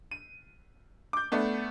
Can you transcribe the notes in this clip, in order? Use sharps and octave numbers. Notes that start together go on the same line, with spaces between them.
D#7
D6 G6
A3 B3 D4